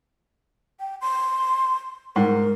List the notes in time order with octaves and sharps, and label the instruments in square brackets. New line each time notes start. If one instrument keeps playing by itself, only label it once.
[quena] G5
C6
[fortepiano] G#2 [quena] A#4